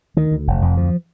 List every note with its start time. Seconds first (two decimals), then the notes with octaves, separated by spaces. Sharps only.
0.17 D2 D#3
0.31 D2
0.47 F1
0.62 F2
0.77 D2 F3